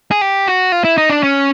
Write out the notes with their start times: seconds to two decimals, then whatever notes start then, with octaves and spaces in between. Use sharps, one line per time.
0.11 G#4
0.21 G4
0.47 F#4
0.72 F4
0.84 E4
0.98 D#4
1.10 D4
1.23 C#4